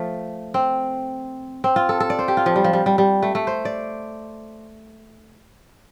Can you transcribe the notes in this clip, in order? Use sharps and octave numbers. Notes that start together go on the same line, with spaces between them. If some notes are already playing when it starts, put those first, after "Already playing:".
Already playing: F3 A3
C4
C4
F4
A4
A4
D5
C5
G4
F4
F3
G3
F3
G3
G3
G3
A3
A3
C5
D5